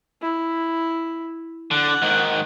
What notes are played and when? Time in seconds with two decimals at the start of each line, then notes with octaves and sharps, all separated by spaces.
0.22 E4
1.71 D3 F#5
2.02 G#2 D#3